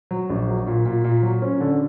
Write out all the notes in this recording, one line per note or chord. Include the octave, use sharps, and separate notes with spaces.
F#3
A#1
F#3
A#2
A#2
A#2
F#3
C#4
D3